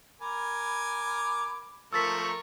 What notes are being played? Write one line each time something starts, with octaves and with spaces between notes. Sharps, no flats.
A#4 G#5 B5 D6
F3 A3 A#4 C#6 E6 A6 B6